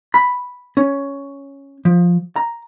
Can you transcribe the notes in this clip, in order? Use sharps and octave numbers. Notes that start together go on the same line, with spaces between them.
B5
C#4
F3
A#5